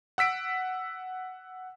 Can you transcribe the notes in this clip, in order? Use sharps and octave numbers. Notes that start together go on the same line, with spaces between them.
F#5 E6 B6 D7